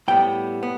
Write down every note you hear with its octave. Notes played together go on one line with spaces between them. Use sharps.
A2 G3 B3 G5
B3